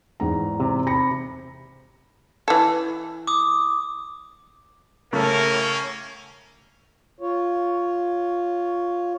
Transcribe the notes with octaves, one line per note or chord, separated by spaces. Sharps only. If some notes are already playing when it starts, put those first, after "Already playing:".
E2 G#2 A#5
C3
B5 A#6 C#7
E3 A4
D6 D#6
A2 C#3 A3 A#3 C#4 A#4
F4 C#5